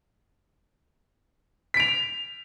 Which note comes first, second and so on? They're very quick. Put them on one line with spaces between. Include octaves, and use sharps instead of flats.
B6 D7 F7